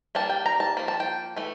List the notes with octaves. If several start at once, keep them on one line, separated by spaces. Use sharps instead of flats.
G3 A#3 D4 A5
G5
A#5
A5
F3 A#3
A5
G5
E3 A3